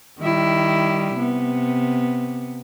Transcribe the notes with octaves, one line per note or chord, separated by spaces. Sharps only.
D#3 G3 E4
C3 B3